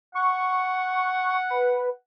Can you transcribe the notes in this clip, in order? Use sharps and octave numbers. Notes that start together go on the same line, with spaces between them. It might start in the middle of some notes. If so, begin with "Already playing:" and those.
F#5 C#6
B4